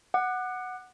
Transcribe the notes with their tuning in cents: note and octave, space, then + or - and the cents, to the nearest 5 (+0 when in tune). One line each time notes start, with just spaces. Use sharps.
F#5 +0 D6 +40